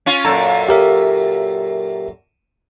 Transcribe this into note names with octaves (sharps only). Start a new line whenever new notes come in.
C#4 F4
F#2 A#2 A4 A#5
G4 A#4 E5